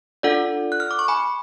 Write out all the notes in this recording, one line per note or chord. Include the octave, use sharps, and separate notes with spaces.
D4 F4 A4 D5 F#5
F#6
F6
D6
C#6
G#5 B5